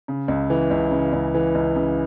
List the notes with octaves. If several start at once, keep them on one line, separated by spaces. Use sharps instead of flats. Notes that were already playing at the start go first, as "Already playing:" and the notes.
C#3
C#2
E3
C#2
C#3
C#2
E3
C#2
C#3